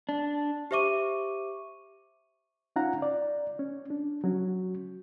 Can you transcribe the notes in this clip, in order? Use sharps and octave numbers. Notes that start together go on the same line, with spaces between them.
D4
G4 C5 E5 C#6 D6 D#7
C#4 D#4 F4 F5 F#5 A#5
D5
C#4
D4
F#3 C#4 F#4